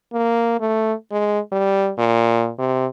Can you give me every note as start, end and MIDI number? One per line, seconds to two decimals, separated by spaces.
0.13 0.59 58
0.60 0.94 57
1.11 1.40 56
1.52 1.91 55
1.98 2.51 46
2.59 2.87 48